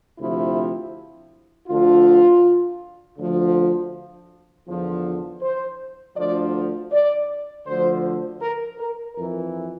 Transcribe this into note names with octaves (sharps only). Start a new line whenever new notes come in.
D2 C3 F3 E4
D2 D3 F3 F4
D2 D3 F3
E2 D3 F3
C5
D2 D3 F3 D5
D5
D2 D3 F3 C5
A#4
A#4
F2 E3 A#4